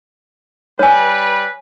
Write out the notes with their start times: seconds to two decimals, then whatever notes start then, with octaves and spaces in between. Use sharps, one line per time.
0.79 G3 B4 C#5 G#5